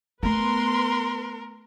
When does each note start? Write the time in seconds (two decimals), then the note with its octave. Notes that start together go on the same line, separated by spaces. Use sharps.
0.23 A3 B3 A#4 B4 C6